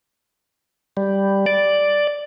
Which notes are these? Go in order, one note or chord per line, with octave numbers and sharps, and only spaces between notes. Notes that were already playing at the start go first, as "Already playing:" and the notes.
G3
D5